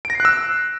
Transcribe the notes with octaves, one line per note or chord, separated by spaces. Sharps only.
D7
A#6
C7
F#6
E6